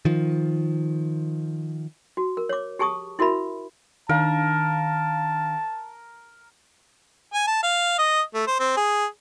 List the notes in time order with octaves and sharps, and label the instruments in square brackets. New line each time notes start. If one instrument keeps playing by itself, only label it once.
[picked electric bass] D#3 F3
[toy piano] F#4
A#4
C#5 D6
G4 G#4 A5 C#6 D#6
E4 F#4 A#4 E5 B5
[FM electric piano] D#3 D4 F5 [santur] A#4 [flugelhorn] A5
[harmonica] G#5
A5
F5
D#5
A3
C5
C4
G#4